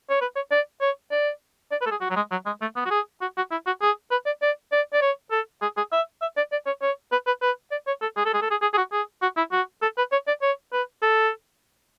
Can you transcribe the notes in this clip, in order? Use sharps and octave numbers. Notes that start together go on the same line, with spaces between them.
C#5
B4
C#5
D5
C#5
D5
D5
B4
A4
G#4
F#4
F#3
G#3
F#3
G#3
A3
B3
F#4
G#4
F#4
F#4
E4
F#4
G#4
B4
D5
D5
D5
D5
C#5
A4
G#4
G#4
E5
E5
D5
D5
C#5
C#5
B4
B4
B4
D5
C#5
A4
G#4
A4
G#4
A4
G#4
G#4
G#4
F#4
G#4
F#4
E4
F#4
A4
B4
C#5
D5
C#5
B4
A4